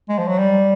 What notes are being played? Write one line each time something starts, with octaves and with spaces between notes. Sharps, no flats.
G#3
F3
F#3
G3